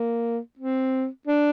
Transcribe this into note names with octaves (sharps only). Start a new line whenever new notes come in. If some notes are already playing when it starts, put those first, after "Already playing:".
Already playing: A#3
C4
D4